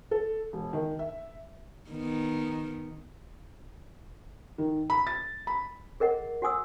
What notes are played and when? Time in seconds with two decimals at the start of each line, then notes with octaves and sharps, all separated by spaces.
0.11 A4
0.53 E1
0.73 D#3
0.99 E5
1.90 D#3 B3
4.58 D#3
4.90 B5
5.07 A6
5.47 B5
6.00 G#4 A#4 D#5 F#5
6.42 F#4 F#5 G#5 D#6 E6